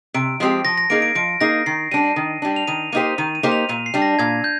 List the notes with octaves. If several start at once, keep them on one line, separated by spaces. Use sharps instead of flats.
C3 D7
F3 G#3 C4 G4
F3 A#6
A#6
A#3 D#4 G#4 D7
D7
F3 D7
A#3 D#4 G#4 A#6
D#3 C7
G3 D4 D#7
D#3
G3 D4
F7
D#3 D#7
A#3 D#4 G4 C5 D#7
D#3 D#7
D#7
A#3 D#4 G4 C5
F7
A#2 D#7
C7
G3 D4
A#6
A#2 G#6
G6